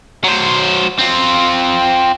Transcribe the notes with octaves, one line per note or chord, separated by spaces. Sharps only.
F#3 C5
C4 F4